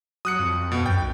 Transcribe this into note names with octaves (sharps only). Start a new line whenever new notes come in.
F#3 D#6 F#6 C#7
F2
B2
F#2 G5
B1